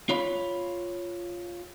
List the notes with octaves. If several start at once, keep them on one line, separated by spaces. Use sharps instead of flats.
F4 C#5 B5